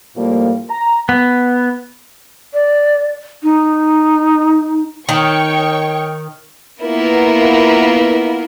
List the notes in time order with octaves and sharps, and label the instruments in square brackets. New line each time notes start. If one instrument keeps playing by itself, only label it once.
[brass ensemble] A2 F3 G3 A#3
A#5
[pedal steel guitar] B3
[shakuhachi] D5
D#4
[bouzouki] D#3 [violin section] C#5 G5 C#6
[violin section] A#3 B3 E4 F4 A#4